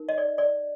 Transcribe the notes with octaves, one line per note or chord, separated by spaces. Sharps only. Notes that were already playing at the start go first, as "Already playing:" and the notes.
Already playing: D#4 A#4
D#5
D5
D5